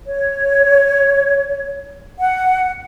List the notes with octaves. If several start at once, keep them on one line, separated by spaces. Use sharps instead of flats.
C#5
F#5